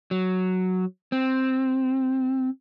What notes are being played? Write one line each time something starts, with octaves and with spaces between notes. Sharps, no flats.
F#3
C4